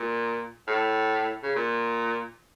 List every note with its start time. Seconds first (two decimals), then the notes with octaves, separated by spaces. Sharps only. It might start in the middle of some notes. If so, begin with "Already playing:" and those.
Already playing: A#2
0.68 A2
1.43 C#3
1.56 A#2